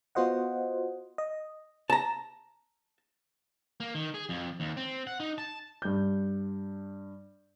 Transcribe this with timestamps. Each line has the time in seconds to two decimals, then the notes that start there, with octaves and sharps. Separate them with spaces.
0.15 B3 F4 F#4 C5 D#5 F#5
1.18 D#5
1.90 A5 A#5
3.80 A#3
3.95 D#3
4.14 G#4
4.29 F2
4.60 D#2
4.77 C4
5.07 F#5
5.20 D#4
5.38 A5
5.82 G2 G6